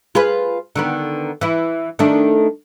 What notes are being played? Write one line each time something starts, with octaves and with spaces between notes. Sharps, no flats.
F4 G#4 B4
D3 D#3 B3
E3 E4
D#3 A3 D4